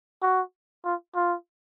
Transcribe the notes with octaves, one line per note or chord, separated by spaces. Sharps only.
F#4
F4
F4